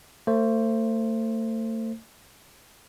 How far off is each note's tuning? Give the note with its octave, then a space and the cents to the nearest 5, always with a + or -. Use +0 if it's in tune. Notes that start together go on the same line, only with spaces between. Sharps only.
A3 +35 C5 +10